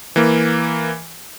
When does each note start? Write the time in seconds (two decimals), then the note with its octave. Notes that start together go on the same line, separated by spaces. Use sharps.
0.16 E3 A#3